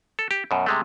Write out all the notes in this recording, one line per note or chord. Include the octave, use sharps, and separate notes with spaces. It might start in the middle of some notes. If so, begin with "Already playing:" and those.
A4
G4
F#2 B2
C3 G#3 A3